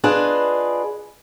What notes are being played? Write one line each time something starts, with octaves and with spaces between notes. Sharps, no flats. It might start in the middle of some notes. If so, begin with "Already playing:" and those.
D4 F4 G#4 B4 D#5